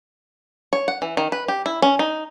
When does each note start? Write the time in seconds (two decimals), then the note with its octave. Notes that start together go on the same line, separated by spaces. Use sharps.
0.73 C#5
0.88 F#5
1.02 E3
1.17 D#3
1.32 B4
1.48 G4
1.66 E4
1.82 C#4
1.99 D#4